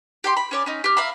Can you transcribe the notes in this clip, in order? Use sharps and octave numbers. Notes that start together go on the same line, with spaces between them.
G4 G5 C6
B5
C#4 C#5 D5
C#4 D#4
G4 F6
E5 F5 A#5 B5